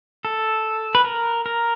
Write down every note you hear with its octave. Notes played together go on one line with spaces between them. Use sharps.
A4
B4
A#4
A#4